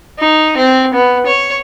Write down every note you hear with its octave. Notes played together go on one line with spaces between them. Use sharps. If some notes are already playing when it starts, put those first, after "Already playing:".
D#4
C4
B3
C#5